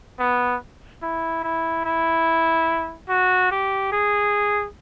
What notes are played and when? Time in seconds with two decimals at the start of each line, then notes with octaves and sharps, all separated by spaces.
0.19 B3
1.02 E4
1.44 E4
1.85 E4
3.09 F#4
3.51 G4
3.92 G#4